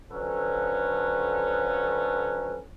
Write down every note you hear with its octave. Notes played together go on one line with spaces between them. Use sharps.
D3 F3 F#3 C#4 A4 B4